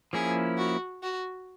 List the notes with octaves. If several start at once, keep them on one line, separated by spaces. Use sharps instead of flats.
F3 A#3 C#4 E4 G#4
F#4
F#4